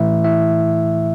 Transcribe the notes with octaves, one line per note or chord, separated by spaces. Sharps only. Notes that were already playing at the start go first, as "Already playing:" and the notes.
Already playing: A2 E3 A3 E4 E5
E4 E5